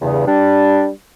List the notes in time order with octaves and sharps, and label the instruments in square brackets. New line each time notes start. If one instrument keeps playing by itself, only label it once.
[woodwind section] E2 G2 C#3
G3 D4